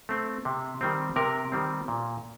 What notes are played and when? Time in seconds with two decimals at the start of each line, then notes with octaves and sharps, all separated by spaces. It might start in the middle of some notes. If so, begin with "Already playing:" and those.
0.09 A3 C4
0.45 C3
0.81 D#3 G3 C4
1.16 C3 A#4
1.52 D#3 G3 C4
1.88 A#2